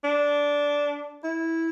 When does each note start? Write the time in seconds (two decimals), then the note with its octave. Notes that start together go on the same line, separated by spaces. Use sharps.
0.04 D4
1.24 E4